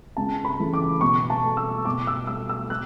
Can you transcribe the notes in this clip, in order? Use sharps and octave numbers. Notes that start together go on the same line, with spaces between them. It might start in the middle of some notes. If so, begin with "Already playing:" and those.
C#2 A5
B5
C#3 E3 A3
D6
B2 C#6
A5
A3
E6
B2 D6
E6
A3 E6
E6
F#6